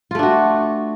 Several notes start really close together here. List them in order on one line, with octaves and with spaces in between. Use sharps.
F4 A3 D4 F#4